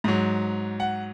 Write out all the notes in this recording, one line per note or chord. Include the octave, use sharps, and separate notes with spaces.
G#2 F#3
F#5